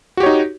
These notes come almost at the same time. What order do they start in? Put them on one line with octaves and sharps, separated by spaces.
F#4 G4 C#5 D#4